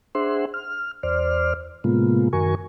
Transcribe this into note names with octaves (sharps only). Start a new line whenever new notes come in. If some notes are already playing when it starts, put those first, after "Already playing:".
D4 G#4 C5 E5 F#5 C6
F6
E2 C5 D5 F6
A2 C3 G#3 A#3 B3 F4
F#2 D#3 F#4 A#4 G#5 C#6